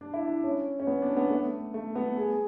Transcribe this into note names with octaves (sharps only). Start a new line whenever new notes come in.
D4
E4
D4
C#4
C#4
B3
D4
B3
A3
A3
B3
G#4